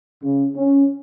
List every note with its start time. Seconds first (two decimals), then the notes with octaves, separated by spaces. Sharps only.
0.23 C#3
0.55 C#4